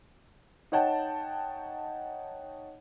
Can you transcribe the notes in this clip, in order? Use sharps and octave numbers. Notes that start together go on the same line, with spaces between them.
D#4 C#5 F#5 G5 A5